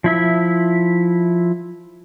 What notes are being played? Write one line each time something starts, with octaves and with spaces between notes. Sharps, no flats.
F3 E4 E5